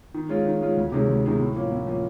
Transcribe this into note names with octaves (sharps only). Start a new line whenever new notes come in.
D#3
G#3 C#4 F4
D#3
G#3 C#4 F4
D2
C3 D#3 G#3 C#4
D2
C3 D#3 G#3 C#4
A2
F3 A#3 C#4
A2
F3 A#3 C#4